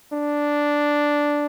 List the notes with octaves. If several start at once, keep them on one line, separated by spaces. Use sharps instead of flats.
D4